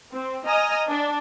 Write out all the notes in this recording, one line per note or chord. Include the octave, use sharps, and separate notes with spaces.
C4
D#5 G#5 A#5 D#6 F6
D4